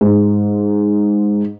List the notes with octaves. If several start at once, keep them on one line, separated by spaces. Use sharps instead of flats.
G#2